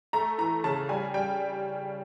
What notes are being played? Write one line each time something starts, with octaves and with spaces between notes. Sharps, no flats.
A3 A#5
E3 A#5
C#3 A5
G3 G#5
G3 G5